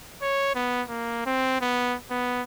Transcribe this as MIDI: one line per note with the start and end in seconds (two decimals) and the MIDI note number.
0.22 0.55 73
0.55 0.82 59
0.89 1.25 58
1.26 1.61 60
1.61 1.95 59
2.11 2.42 59